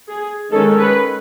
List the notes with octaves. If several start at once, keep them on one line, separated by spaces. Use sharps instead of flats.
G#4
D#3 G#3 C#4 A4
B4